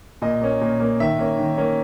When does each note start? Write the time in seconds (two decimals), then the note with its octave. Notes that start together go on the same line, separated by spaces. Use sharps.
0.22 A#2 D#5
0.41 A#3 C#4
0.61 A#2
0.80 A#3 C#4
1.00 D#3 E5
1.19 A#3 C#4
1.39 D#3
1.58 A#3 C#4